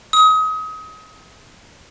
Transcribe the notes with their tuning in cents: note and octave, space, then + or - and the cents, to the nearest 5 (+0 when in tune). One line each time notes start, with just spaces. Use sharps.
D#6 +30